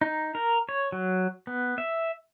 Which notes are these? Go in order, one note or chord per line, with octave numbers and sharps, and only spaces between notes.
D#4
A#4
C#5
F#3
B3
E5